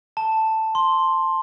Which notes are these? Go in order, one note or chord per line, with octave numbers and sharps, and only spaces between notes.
A5
C6